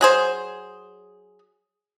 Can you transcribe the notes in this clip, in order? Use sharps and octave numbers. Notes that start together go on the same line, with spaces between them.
F#3 G#4 C5